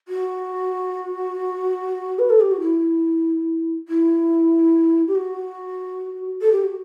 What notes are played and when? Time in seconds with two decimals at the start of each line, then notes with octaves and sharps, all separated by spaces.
0.08 F#4
2.18 B4
2.29 A4
2.40 G4
2.51 F#4
2.61 E4
3.88 E4
5.07 G4
5.15 F#4
6.41 A4
6.52 G4
6.63 F#4